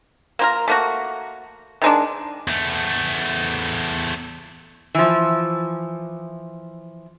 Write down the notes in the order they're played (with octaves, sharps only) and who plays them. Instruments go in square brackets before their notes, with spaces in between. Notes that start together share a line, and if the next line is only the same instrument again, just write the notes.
[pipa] A#3 F4 A#4
A3 A#3 F#4
D#3 G#3 D4
[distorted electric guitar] E2 A3
[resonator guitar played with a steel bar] E3 F3